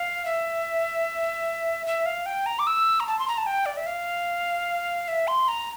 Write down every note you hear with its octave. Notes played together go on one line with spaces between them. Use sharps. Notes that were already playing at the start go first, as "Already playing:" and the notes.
Already playing: F5
E5
E5
F5
G5
A#5
D6
E6
A#5
A5
C6
A#5
A5
G5
D5
E5
F5
E5
C6
A#5